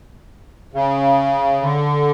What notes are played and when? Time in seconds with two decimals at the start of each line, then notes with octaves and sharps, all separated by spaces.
0.73 C#3
1.61 D3